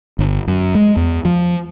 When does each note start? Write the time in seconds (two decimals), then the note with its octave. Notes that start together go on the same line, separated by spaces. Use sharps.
0.19 G1
0.48 F#2
0.75 G#3
0.97 E2
1.25 F3